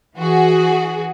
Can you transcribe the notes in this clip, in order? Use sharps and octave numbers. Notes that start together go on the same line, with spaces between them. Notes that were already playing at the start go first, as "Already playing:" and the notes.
E3 F#4 G#4